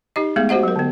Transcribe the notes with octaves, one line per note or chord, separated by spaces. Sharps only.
D#4 G4 D#5
G#3 A3 B3 G#4
F#4 G4 C5 D#5 F#5
F#3 A#4
D3 B3